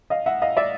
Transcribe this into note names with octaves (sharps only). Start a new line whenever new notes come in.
D#5 F5
E5 F#5
D#5 F5
D5 E5